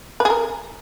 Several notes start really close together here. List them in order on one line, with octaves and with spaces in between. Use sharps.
B4 G#4 A#4